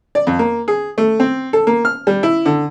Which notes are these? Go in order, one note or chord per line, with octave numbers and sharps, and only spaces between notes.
D5
F2
A#3
G#4
A3
C4
A4
A#3
F6
G3
E4
D3